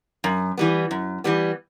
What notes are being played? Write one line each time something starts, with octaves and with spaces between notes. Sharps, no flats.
F#2
E3 G3 B3
F#2
E3 G3 B3